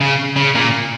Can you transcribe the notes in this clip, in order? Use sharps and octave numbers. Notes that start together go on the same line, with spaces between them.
C#3
C#3
A#2